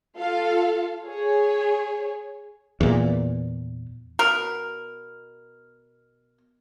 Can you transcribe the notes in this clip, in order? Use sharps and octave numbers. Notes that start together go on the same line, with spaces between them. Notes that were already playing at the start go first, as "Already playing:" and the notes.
F4 A4 F5
G#4 C#5
E2 A#2
B2 A#4